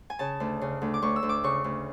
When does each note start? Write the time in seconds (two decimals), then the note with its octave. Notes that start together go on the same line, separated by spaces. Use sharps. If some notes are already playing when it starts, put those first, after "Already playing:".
0.10 G#5
0.19 C#3 A5
0.40 D2
0.61 C#3
0.82 D2
0.94 D6
1.02 D2 C#6
1.16 E6
1.23 D2
1.29 D6
1.44 C#3 C#6
1.64 D2